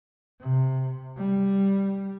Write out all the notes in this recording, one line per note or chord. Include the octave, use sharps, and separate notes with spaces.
C3
G3